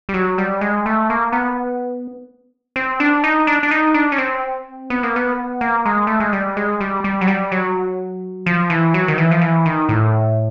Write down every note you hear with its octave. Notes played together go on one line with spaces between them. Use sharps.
G3
F#3
G3
G#3
A3
A#3
B3
C4
D4
D#4
D4
D4
D#4
D4
C#4
C4
B3
A#3
B3
A#3
G#3
A3
G#3
G3
G#3
G3
G3
F#3
G3
F#3
F3
E3
F#3
D#3
E3
F3
E3
D#3
A2